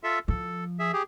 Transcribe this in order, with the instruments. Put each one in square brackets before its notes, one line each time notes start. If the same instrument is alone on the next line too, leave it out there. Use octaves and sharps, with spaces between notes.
[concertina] F4 A4 E5
[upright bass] F3 [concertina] A4
[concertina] G#4 E5
G4 G#4